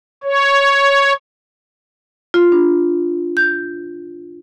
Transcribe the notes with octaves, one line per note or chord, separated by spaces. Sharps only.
C#5
F4
D4
G6